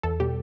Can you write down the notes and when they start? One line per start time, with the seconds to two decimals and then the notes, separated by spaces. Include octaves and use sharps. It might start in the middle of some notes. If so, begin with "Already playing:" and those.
0.03 E2 A4
0.20 B2 G3 G4